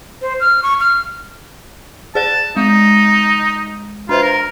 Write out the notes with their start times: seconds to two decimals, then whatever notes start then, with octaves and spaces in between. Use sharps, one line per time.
0.22 C5
0.41 F6
0.63 C#6
0.80 F6
2.15 G#4 D5 A5 F#6
2.57 G#3 D#4
4.09 D4 F4 B4 C5
4.22 A#4